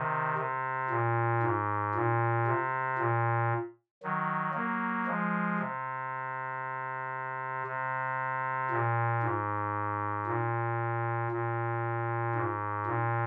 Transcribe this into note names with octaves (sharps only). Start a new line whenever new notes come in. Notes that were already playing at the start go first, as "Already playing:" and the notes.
Already playing: C3 D#3
C3
A#2
G#2
A#2
C3
A#2
D#3 F#3
F#3 A#3
F3 G#3
C3
C3
A#2
G#2
A#2
A#2
G#2
A#2